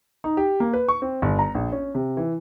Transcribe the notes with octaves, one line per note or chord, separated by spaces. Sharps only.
D#4
G4
A#3
B4
C#6
C4
G1
A#5
A#1
C#4
C3
E3